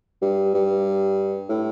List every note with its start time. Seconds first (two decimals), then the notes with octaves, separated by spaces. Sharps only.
0.22 G2
0.54 G2
1.49 A2